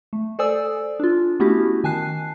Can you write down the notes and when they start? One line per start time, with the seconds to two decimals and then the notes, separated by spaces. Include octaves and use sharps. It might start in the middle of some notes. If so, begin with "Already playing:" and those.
0.13 A3
0.39 A4 C5 D5 G#5 D#6 E6
1.00 D4 F4
1.40 A3 B3 C#4 E4 F#4 G4
1.84 D#3 G#5 A5 F#6 C7